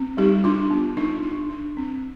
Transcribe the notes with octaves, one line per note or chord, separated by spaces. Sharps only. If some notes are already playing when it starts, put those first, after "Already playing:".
Already playing: C4
G3 D#4 G4
D4 F4
B3
D4 D#4
D4
D4
C4